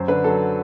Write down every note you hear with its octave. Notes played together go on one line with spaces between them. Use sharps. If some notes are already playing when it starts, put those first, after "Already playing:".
Already playing: F#2 C5
D3 B4
F#3 A4